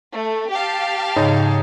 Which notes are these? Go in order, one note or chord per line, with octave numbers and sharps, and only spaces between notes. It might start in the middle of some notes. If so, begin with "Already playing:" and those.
A3
G4 F5 A5
G#2 C#3 D#4 G#4 C#5